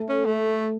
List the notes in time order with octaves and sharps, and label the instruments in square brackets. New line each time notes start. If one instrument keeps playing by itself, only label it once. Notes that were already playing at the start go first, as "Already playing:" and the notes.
Already playing: [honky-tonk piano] A3
[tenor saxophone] C#4
A3